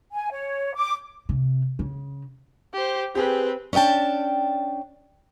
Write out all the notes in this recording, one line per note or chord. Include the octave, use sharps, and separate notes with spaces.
G#5
C#5
D6
C3
C#3
G4 C5
C4 G4 G#4 B4
C#4 D4 D#5 G5 A5